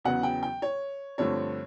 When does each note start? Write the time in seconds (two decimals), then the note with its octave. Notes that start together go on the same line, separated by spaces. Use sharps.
0.05 E2 C#3 F#3 B3 F#5
0.23 G5
0.43 G5
0.62 C#5
1.18 G2 D3 F3 A3 C4 C#5